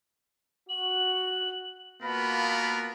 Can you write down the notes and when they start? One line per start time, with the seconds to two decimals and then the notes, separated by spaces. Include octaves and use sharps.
0.69 F#4 F#7
2.03 B2 A#3 B3 F4 A#4 B5